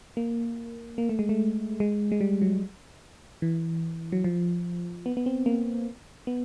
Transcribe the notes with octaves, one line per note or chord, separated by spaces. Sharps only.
A#3
A#3
A3
G#3
A3
G#3
G#3
G3
F#3
E3
F#3
F3
B3
B3
C4
A#3
B3